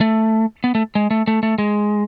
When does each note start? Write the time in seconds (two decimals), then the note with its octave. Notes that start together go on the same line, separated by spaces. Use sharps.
0.01 A3
0.64 B3
0.75 A3
0.95 G#3
1.11 A3
1.27 A3
1.43 A3
1.58 G#3